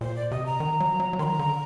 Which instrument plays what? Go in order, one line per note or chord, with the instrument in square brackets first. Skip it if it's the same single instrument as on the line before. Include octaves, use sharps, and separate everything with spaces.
[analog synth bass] A#2 [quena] C5
[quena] D5
[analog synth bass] C3 [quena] D#5
[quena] A#5
[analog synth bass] D#3
F#3
F#3
F#3
[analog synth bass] D#3 [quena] C6
[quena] A#5
[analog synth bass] D3